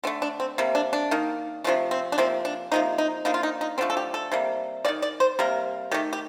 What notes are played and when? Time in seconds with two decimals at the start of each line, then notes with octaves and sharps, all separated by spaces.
0.04 D3 A3 C4
0.22 D4
0.40 C4
0.58 C3 G3 A#3
0.75 D4
0.93 D4
1.11 D#3 A#3
1.64 C3 F3 A3 D4
1.91 C4
2.12 D4
2.18 C3 F3 A#3 C4
2.45 D4
2.71 C3 F3 A#3 D#4
2.98 D#4
3.25 D3 F3 A#3 D#4
3.34 F4
3.43 D#4
3.61 D#4
3.78 D3 F3 A3 C4
3.90 A4
3.97 G4
4.14 A4
4.32 C3 G3 A#3
4.85 A#3 D5
4.88 D#3
5.02 D5
5.20 C5
5.39 C3 G3 A#3 A#4
5.91 D#3 A3 G4
6.13 G4